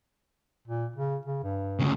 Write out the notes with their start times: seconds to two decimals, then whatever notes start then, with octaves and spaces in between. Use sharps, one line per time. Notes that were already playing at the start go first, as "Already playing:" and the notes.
0.68 A#2
0.96 C#3
1.26 C#3
1.44 G2
1.79 D2 C#3